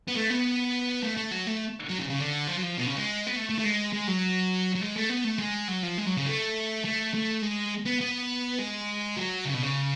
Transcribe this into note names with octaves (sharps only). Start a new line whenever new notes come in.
B3
A3
B3
A3
A3
F#3
A3
F#3
C#3
C#3
D3
F3
F#3
F3
B2
C#3
G#3
B3
A3
A3
A3
G#3
G#3
F#3
F#3
G#3
A3
B3
A3
G#3
F#3
F3
G#3
F#3
C#3
A3
A3
A3
G#3
B3
B3
G#3
F#3
C#3
B2
C#3